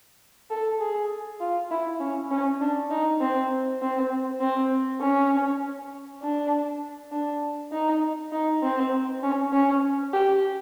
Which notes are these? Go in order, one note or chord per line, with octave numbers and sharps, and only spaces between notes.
A4
G#4
F4
E4
C#4
C#4
D4
D#4
C4
C4
C4
C#4
D4
D4
D#4
D#4
C4
C#4
C#4
G4